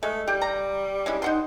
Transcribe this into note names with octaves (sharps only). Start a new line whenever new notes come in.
G#3 A3
G3 G4
A#5
G#3 C#4 E4
D#4 F#5 C6